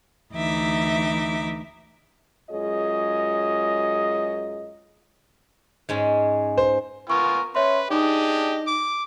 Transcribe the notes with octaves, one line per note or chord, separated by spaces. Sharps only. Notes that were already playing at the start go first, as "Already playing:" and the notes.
D2 E3 D#4 E5 D6
F#2 G#3 F4 G#4 C#5 D#5
G#2 G#3 C#4
C5
B3 F4 A#4 G#5 C#6
C#4 B4 C#5 E5 C6
D4 D#4 G4 G#4 D#5
D6